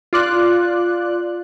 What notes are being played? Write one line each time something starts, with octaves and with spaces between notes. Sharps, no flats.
F4 D5 F#6